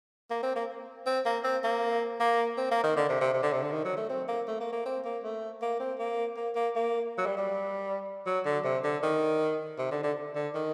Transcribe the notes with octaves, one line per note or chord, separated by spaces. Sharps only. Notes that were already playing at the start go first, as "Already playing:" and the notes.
A#3
C4
A#3
C4
A#3
C4
A#3
A#3
C4
A#3
D#3
D3
C3
C3
C3
D3
C3
D3
D#3
F#3
A3
C4
A#3
A3
A#3
A#3
C4
A#3
A3
A#3
C4
A#3
A#3
A#3
A#3
F#3
G3
G3
F#3
D3
C3
D3
D#3
C3
D3
D3
D3
D#3